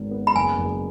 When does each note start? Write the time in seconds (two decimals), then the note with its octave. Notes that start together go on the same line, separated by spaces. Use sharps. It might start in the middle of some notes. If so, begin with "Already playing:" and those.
Already playing: G#1 G#2 D#3 B3
0.11 B3
0.27 B5
0.35 F#1 G#5
0.59 F#1